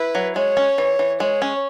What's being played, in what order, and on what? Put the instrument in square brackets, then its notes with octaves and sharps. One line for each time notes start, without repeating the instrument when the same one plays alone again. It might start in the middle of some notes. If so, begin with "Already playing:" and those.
Already playing: [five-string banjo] E4 [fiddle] B4
[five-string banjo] F#3
[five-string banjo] G#3 [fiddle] C#5
[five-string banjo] C#4
E3
E3
[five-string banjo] G#3 [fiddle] C#5
[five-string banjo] C#4